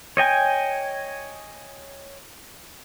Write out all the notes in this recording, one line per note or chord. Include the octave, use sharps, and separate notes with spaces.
C#5 D#5 G5 G#5